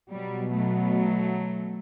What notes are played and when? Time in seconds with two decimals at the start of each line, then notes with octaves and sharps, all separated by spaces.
0.10 B2 F#3 G3
0.55 F#3 A3